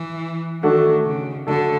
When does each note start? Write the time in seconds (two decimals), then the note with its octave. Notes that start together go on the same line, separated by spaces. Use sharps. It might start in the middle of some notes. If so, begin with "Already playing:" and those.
Already playing: E3
0.63 D#3 A3 D4 F#4 A4
1.04 C#3
1.47 D3 A3 D4 F#4 A4